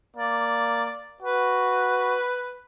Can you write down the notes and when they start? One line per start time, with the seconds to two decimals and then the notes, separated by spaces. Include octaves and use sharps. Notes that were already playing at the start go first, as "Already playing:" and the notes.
0.16 A#3 D5
1.22 F#4 B4